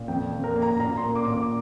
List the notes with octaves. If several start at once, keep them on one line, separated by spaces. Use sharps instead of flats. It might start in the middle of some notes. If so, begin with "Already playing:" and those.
Already playing: A#2
F2 G5
F2
A#4
A#3
A#5
A#2 A#5
C6
A#3
D6
A#2
D6